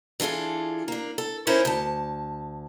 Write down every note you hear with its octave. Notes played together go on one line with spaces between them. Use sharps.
E3 D4 F4 G#4 A4
A#3 D4
A4
C#4 D#4 E4 A#4 C5 C#5
D2 A5